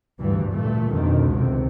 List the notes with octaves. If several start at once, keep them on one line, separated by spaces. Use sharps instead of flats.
D2 G2 E3
A#2 A3
F2 B2 D3 D#3
C#2 C3